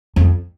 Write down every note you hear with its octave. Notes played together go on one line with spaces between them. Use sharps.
F2